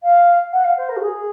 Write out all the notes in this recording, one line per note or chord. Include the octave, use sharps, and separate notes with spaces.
F5
F#5
F5
C5
A#4
F#4
G#4